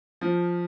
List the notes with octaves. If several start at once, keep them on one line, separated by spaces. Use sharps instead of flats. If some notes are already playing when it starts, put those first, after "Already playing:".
F3